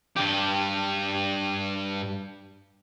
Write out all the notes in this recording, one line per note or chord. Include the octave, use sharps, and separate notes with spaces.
G2 G4